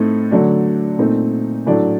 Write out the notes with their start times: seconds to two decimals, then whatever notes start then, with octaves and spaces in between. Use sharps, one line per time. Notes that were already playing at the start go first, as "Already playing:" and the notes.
Already playing: A2 A3 C4 D#4
0.31 D3 F#3 A3 D4
0.98 A#2 A3 C4 D#4
1.66 A2 F#3 A3 D4